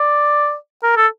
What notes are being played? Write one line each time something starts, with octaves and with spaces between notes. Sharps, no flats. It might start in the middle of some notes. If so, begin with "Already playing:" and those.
Already playing: D5
A#4
A4